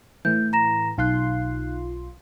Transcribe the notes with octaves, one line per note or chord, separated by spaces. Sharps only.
A2 E3 G6
A#5 A#6 E7
B1 D#4 F4 C6 F#6